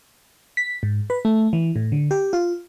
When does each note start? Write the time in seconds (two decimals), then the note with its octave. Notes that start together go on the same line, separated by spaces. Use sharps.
0.57 B6
0.83 G#2
1.10 B4
1.25 A3
1.53 E3
1.76 A2
1.92 D3
2.11 G4
2.33 F4